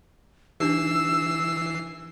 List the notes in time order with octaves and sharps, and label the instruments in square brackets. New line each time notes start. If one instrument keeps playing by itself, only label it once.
[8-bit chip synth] E3 C7 [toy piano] D4 D#4 G4 [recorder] E6